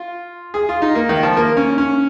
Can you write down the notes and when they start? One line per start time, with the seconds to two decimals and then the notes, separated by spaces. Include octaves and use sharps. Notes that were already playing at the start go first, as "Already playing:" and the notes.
Already playing: F4
0.54 G#4
0.69 F4
0.82 D#4
0.95 A#3
1.09 D#3
1.23 F3
1.37 A#3
1.57 C#4
1.78 C#4